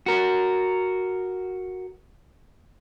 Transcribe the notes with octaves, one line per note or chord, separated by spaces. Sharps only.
F#4 A#4